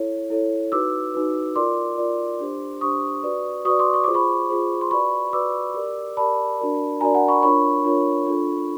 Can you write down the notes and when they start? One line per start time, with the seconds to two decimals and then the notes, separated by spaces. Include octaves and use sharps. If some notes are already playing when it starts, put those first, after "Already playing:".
Already playing: E4 A4 C#5
0.30 E4 A4 C#5
0.72 D#4 F#4 B4 D6 E6
1.14 D#4 F#4 B4
1.56 F4 A#4 D5 C6 D6
1.98 F4 A#4 D5
2.40 D4 G4 C5
2.81 D4 G4 C5 C#6 D#6
3.23 F#4 B4 D5
3.65 F#4 B4 D5 C#6 D#6
3.79 C6 D6
3.94 C#6
4.04 F4 G#4 C5 D6
4.14 B5 C#6
4.50 F4 G#4 C5
4.81 C6
4.91 F#4 B4 D5 B5 C#6
5.33 F#4 B4 D5 D6 E6
5.74 G4 A#4 D5
6.17 G4 A#4 D5 A5 B5
6.59 D4 F#4 A#4 D5
7.01 D4 F#4 A#4 D5 G#5 A#5
7.15 F#5 G#5
7.28 B5 C#6
7.43 D4 F4 A#4 C#5 B5 C#6
7.84 D4 F4 A#4 C#5
8.27 D4 F4 A4